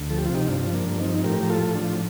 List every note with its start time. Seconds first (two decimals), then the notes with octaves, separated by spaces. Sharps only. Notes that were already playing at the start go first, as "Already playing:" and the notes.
Already playing: D2
0.10 F3 A4
0.18 G4
0.26 F4
0.29 C3
0.35 D#4 G4
0.48 G2 D4 F4
0.67 F3
0.73 A#3 D4
0.86 G2
0.99 C4 D#4
1.06 F3
1.24 A2 G4 A#4
1.43 F3 A#4
1.50 F4 A4
1.62 A2
1.75 D4 F4
1.81 F3